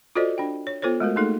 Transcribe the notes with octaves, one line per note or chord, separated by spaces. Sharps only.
F4 F#4 A4 C5 D5 D#5
D4 G5
C#5
B3 F4 A4 C5 C#5
G#3 A3 F#4 A#4
A3 A#3 D#4 G#4 A4